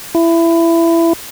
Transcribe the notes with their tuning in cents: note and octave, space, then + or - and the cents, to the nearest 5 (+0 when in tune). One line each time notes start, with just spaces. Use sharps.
E4 +20